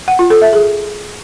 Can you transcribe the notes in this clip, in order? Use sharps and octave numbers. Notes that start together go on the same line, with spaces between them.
F#5
F4
A4
E5
G#4